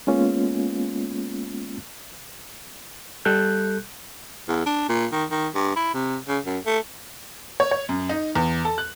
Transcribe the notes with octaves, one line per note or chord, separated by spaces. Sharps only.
G#3 A#3 B3 C#4 F4
G3 A4 F#6 G6
E2
D4
A#2
D#3
D#3
G2
E4
C3
C#3
F#2
A3
C#5
C#5
F#2
D#4
E2
A4
F#6